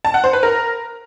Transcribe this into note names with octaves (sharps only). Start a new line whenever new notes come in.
A5
F#5
C5
B4
A#4